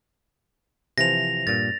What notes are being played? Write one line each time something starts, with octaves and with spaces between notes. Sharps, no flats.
C3 E3 F3 A#6 F7
G2 A#2 A6